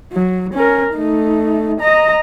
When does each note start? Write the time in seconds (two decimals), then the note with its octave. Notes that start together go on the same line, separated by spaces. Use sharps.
0.13 F#3
0.54 C#4 A#4
0.95 A3 D#4
1.80 D#5 A#5